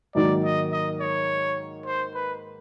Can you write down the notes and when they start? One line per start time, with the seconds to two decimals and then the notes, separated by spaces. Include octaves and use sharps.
0.15 G#2 D#3 F#3 A#3 D#4 D5
0.44 D#5
0.72 D#5
1.00 C#5
1.86 C5
2.14 B4